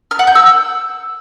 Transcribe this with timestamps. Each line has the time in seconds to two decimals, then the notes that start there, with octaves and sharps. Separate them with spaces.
0.11 F6
0.19 F#5
0.27 G6
0.35 E6